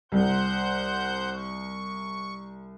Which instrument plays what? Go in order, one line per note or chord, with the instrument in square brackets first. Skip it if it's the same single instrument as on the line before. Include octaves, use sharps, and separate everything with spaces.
[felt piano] C2 [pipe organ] C5 F#5 G6
[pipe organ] C#6